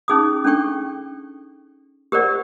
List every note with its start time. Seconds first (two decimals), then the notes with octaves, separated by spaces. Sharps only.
0.08 C#4 D#4 G#4 D6 D#6
0.44 C#4 D4 A4 G5 C#6
2.12 G4 A#4 C5 D5 F#5